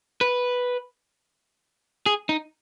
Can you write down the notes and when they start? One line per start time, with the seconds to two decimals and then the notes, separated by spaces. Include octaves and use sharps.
0.21 B4
2.06 G#4
2.29 D#4